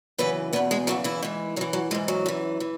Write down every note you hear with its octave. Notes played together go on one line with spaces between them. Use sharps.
F#2 C#3 E3 B3 B4
E2 B2 B3 B4
G#3 G#4
F#2 C#3 E3 F#3 F#4
E3 E4
G#2 E3
F#2 E3 F#3
F#3
G#2 E3 G#3
F#3
F#2 E3
E3